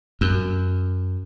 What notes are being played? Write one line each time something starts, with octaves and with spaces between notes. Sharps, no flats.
F#2